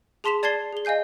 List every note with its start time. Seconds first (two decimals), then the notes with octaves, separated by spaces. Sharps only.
0.24 G#4 A5 C6 B6 E7 F7
0.43 D5 A5 G#6 A6 C7 G7
0.73 G#4 G7
0.85 D#5 F5 G#5 G6 C7